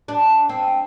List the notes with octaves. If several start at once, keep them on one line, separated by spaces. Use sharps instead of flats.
D4
C4